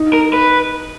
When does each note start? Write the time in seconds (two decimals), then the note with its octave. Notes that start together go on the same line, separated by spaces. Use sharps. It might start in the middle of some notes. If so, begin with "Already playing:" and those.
Already playing: D#4
0.13 A#4
0.33 B4